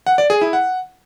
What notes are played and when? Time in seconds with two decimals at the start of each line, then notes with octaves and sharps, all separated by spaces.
0.07 F#5
0.18 D5
0.30 G#4
0.41 E4
0.53 F#5